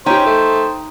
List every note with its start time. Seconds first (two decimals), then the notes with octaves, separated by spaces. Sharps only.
0.06 C#4 D#4 G4 C5 G5
0.26 A3